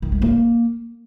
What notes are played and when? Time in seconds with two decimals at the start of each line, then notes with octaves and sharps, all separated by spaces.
0.02 D#3
0.12 G#3
0.22 A#3